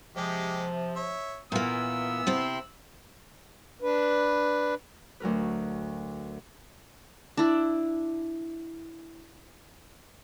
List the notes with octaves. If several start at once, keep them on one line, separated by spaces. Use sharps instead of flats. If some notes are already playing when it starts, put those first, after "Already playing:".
C3 F3 G#3 G4
C#5 E5
A#2 E3 A#3 B3 E6
C3 C4 E4
D4 B4
D2 F#3 A#4 B4
D4 E4